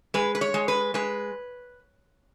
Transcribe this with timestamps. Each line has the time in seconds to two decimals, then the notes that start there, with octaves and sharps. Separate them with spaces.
0.14 G#3 B4
0.35 B4
0.41 C#5
0.54 G#3
0.68 B4
0.94 G#3 B4